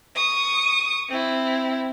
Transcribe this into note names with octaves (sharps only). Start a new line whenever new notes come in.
C#6 D#6
C4 E4